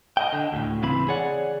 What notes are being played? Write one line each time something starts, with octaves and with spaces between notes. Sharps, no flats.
D#5 E5 G5
D3
D2 A2
C#3 E3 C4 E4 B5
G#4 C#5 D5 F#5